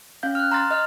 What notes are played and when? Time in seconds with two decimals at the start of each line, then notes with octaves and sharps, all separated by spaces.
0.23 C#4 F5 G6
0.35 F6 F#6
0.51 A#5 C6 F6 A6
0.71 D#5 F6